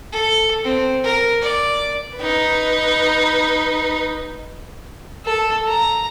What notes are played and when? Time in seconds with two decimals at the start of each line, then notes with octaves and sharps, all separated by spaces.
0.12 A4
0.64 C4
1.04 A#4
1.42 D5
2.17 D#4 B4
5.25 A4
5.68 A#5